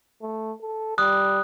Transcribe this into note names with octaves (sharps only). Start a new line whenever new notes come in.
A3
A4
G3 D#6 F#6